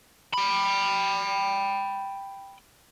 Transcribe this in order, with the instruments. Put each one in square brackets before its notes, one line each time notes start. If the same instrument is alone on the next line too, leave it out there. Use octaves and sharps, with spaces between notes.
[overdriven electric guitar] G5 B5